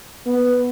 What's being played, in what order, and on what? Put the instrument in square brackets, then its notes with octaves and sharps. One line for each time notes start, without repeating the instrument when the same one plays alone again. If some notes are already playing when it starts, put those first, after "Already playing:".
[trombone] B3